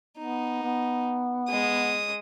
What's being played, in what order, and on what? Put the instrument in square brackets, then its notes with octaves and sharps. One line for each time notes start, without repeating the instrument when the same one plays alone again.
[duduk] B3 [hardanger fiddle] D#4
[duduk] B3
[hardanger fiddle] G#3 D#6